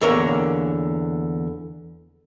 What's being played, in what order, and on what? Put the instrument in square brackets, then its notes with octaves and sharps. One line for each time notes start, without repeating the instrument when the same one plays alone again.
[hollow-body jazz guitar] E2 D3 A#3 A#4 C#5